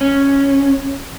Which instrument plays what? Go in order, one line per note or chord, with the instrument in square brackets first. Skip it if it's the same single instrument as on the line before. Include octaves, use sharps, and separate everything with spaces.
[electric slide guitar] C#4